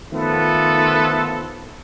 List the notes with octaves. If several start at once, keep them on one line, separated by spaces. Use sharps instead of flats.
D#3 F3 A3 B3 F4 A4